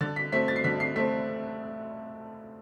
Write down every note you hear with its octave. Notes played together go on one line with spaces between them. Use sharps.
D3 A6
B6
A3 C4 B6
A6
C7
D3 B6
C7
A3 C4 B6